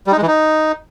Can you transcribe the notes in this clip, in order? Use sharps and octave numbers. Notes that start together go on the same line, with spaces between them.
G3
D#4
G#3
E3
D#4